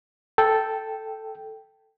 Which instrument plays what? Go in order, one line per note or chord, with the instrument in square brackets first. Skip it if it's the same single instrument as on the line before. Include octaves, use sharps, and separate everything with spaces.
[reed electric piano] A4 G5